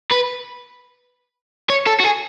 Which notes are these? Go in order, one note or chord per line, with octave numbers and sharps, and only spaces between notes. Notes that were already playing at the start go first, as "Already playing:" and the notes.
B4
C#5
A4
F#4
G#4